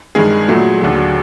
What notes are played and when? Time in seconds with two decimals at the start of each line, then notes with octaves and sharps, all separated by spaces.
0.15 G2 D#3 G#3 G#4
0.48 A#2 F#3 A3
0.82 D#2 D3 F#3